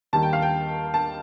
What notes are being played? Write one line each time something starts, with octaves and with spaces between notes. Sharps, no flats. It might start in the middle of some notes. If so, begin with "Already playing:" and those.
D#2 D#3 G3 A#3 A5
G5
F5
G5
A5